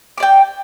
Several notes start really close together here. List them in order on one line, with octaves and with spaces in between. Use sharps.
D6 D5 G5